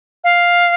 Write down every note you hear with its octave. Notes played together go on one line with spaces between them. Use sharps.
F5